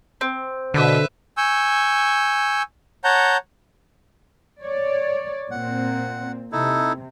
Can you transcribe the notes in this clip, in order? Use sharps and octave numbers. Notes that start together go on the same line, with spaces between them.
C4
B2 D3 B4 E5
G#5 C#6 E6 G6
C#5 F#5 A5 A#5 G6
C#5 D5
A#2 C4 F#5
C3 D#4 E4 A4